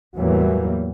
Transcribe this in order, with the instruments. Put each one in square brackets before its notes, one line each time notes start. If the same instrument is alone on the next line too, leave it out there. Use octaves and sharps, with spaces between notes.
[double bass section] E2 A2 E3 F#3 G3 A#3